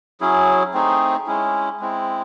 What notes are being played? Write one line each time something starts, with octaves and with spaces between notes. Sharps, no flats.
F#3 C#4 E4 G#4
A3 C4 D#4 G#4
G#3 C#4 E4
G#3 C4 E4